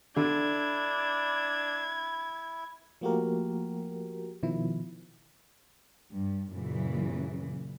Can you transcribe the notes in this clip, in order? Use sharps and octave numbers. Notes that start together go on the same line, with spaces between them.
D3 D4 E4 G#6
F3 A3 A#3 F#4 G4 A#4
B2 D#3 F3 E4
G2
F#2 A#2 C#3 E3